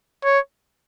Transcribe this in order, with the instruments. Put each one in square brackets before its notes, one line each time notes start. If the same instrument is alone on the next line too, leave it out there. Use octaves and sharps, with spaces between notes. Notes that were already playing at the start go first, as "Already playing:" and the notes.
[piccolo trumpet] C#5